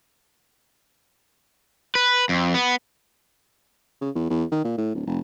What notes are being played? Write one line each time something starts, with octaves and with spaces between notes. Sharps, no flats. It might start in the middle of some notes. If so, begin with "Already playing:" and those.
B4
F2
B3
C#3
E2
E2
D#3
A#2
A2
D1
F1